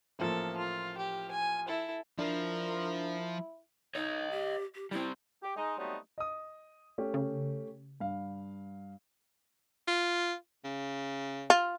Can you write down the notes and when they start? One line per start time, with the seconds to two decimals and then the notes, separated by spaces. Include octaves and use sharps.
0.19 A1 F3 A#3 A4
0.57 F4
0.97 G4
1.31 G#5
1.68 E4 A4
2.19 F3 D4 E4 A#4
3.95 D#4 C#5 D#5
4.31 G4
4.75 G4
4.91 G3 C4 E4
5.43 G4
5.57 G#3 D#4
5.78 F#3 G3 A3 B3 C4 D#4
6.18 D#5 D#6
6.98 A3 C#4 G4
7.14 C#3
8.00 G2 F5
9.88 F4
10.64 C#3
11.50 F4